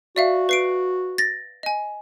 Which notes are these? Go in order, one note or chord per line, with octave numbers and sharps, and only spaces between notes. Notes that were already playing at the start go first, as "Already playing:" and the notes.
F#4 D5 E5 F5
B4 C7 D7
A6 A#6
D#5 G#5